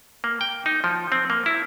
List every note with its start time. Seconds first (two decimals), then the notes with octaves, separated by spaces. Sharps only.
0.24 A#3
0.41 G5
0.66 D#4
0.84 F3
1.12 C4
1.30 A#3
1.46 E4